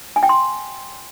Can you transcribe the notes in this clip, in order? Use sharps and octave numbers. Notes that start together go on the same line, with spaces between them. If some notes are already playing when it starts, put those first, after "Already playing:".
G#5
G5
C6